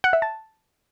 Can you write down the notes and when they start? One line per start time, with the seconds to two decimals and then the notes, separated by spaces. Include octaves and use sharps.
0.04 F#5
0.13 E5
0.22 A5